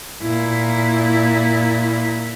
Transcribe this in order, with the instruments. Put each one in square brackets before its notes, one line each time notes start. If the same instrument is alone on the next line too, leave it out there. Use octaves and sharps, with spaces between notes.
[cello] A#2 E4